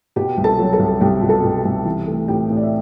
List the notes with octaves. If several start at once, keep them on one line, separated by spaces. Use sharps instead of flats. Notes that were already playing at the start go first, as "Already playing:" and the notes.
B2 G4 G5
C2
A4 A5
F#3
A4 A5
C2
C2 G4 G5
B2
A4 A5
B2
C2
E3
A3
A2 G4 G5
A2
D5
E5